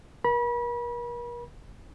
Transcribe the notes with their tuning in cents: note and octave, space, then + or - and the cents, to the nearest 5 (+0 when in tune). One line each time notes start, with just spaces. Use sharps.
A#4 +40 B5 -35